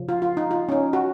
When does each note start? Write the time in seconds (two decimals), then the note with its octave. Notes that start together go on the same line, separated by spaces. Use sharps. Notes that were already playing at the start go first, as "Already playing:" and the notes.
Already playing: C#3 F3
0.09 F4
0.22 F4
0.37 D#4
0.51 F4
0.69 C#4
0.72 D#4
0.93 F#4